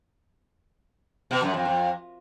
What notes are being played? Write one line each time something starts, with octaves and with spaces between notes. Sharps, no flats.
B2
F#2
F2
F2